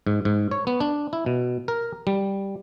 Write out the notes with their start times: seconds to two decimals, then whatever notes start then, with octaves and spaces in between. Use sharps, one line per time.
0.07 G#2
0.25 G#2
0.51 C#5
0.67 B3
0.80 D4
1.13 E4
1.26 B2
1.68 A#4
2.07 G3